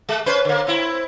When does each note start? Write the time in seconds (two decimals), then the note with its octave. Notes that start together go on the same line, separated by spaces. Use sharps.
0.09 G#3
0.26 C#4 B4 C5
0.45 D3 A#3
0.67 C4 E4